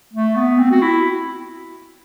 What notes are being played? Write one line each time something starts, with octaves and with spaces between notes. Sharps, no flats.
A3
B3
C4
F#4
E4